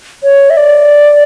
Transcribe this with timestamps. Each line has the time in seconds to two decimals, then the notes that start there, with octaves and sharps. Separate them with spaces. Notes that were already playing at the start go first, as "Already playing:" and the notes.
0.24 C#5
0.50 E5
0.57 D5